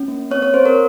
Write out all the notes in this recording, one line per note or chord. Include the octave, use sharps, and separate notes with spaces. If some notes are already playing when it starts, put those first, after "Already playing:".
Already playing: C#4
A#3
C4 C#5
C#5
C4 C5
A#4